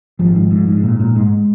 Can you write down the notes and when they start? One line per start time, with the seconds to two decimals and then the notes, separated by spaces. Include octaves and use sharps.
0.19 G#1 F3
0.35 G#2
0.51 G#2
0.68 G#2
0.83 A#2
1.00 A#2
1.15 G#2 G#3